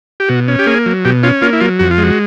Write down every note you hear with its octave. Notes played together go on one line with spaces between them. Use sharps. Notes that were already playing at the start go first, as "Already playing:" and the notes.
G4
B2 F#4
C#4
G4
A#3 G#4
F#3
B2 G4
C#4 F4
A#3 F4
E4
F#3 F4
F2 F#4
F4
G#3
F#4